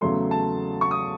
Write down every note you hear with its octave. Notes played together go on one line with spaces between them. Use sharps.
E2 C#3 F#3 A3 C6
A5
C#6
D#6